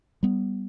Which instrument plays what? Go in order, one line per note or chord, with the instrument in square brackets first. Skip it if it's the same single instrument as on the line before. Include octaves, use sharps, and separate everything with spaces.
[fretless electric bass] G3 B3